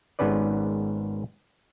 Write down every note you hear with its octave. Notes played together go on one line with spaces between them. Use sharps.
G#1 G#2 B3 C#4 B4 D5